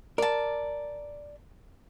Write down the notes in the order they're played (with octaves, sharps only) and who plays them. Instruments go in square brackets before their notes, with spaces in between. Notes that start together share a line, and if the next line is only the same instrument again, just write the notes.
[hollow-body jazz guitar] A#4 [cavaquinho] D5 A5